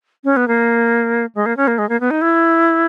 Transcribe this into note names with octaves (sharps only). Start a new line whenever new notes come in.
C#4
B3
A#3
G#3
A#3
C#4
A#3
G#3
A#3
B3
D#4
E4